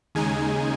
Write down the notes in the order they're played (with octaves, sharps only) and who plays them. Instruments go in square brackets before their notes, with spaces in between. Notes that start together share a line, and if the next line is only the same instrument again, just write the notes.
[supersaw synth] D#2 C#3 G#3 D#4 G#5